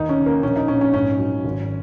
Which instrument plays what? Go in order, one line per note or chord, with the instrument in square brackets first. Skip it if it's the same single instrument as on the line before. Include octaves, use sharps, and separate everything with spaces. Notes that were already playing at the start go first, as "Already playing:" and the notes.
Already playing: [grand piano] D#2 D#4
C#4
C#3
A#3
A#1 C#4
D#4
A#1 C#4
C#4
G#2 C#4
F#3
G#1